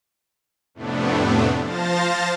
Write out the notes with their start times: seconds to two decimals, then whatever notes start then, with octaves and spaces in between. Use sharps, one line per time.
0.74 F2 A2 C3 A3 B3 D4
1.61 F3 C5 F5 A5 A6 A#6